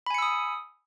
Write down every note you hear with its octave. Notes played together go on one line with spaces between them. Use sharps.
G#5 B5 D#6 E6 C#7